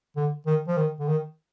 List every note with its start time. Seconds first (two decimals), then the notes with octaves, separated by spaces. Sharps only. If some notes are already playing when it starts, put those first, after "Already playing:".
0.16 D3
0.46 D#3
0.67 F3
0.77 D#3
1.00 D3
1.08 D#3